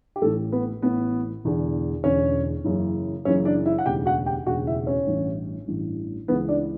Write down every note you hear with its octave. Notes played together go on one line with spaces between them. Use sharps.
G4
A1 A2 E3 A3 A4
B3 B4
A1 A2 E3 B3 B4
E1 E2 D3
E1 E2 D3 C#4 C#5
F#1 F#2 C#3 E3
F#1 F#2 C#3 E3 C#4 C#5
D4 D5
E4 E5
F#5
E1 D2 C#3 G4 G5
F#4 F#5
G4 G5
E1 D2 C#3 F#4 F#5
E4 E5
C#4 C#5
A1 G2 E3
A1 G2 E3
C#2 C#3 E3 B3 B4
D4 D5